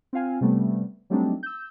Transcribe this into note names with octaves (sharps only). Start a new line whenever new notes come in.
C4 F4 F5 G#5
C3 G3 A3 B3
F#3 G3 A3 C4 D4 D#4
E6 G6